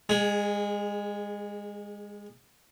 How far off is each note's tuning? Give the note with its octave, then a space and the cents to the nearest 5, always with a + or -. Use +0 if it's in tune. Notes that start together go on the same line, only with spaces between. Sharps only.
G#3 -25 G#4 +10